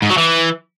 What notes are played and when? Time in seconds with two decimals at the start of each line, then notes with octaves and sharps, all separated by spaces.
0.02 G#2
0.10 F#3
0.18 E3